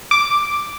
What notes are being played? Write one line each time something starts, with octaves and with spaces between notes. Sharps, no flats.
D6